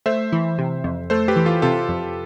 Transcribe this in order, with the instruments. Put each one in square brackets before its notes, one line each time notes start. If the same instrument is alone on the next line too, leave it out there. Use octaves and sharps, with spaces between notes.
[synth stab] A3 [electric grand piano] C5 E5
[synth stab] E3
C3
F2
[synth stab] A3 [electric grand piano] A4 C5
[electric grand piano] G4 B4
[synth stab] E3
[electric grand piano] F4 A4
[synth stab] C3 [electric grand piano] F4 A4
[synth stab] F2